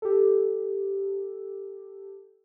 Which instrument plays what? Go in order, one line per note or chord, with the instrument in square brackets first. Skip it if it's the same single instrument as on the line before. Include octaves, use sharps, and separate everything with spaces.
[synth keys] G4 A4